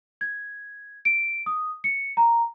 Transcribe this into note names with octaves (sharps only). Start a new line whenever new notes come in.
G#6
D7
D#6
C#7
A#5